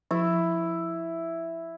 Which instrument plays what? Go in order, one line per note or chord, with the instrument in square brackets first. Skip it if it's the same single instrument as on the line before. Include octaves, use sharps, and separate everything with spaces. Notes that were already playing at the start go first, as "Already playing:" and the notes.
[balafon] F3 [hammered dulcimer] E4